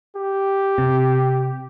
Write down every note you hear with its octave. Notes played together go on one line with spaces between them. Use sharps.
G4
C3